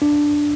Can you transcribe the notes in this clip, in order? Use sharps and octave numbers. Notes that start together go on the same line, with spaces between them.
D4